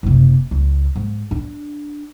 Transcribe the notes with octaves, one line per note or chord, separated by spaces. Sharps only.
F#1 C3
C#2
G#2
D4